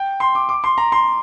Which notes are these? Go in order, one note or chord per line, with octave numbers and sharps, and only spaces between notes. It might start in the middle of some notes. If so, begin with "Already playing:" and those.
Already playing: G5
C6
D6
D6
C6
A#5
C6